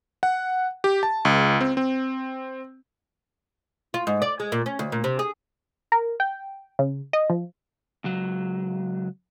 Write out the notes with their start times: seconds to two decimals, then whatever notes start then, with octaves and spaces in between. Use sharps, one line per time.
0.23 F#5
0.84 G4
1.03 A5
1.25 C#2
1.61 C4
1.77 C4
3.94 F4
4.07 G#2
4.22 D5
4.40 G#3
4.52 A#2
4.66 C#4
4.79 D2
4.92 A#2
5.04 C3
5.19 G#4
5.92 A#4
6.20 G5
6.79 C#3
7.13 D#5
7.30 F3
8.04 C#2 F#3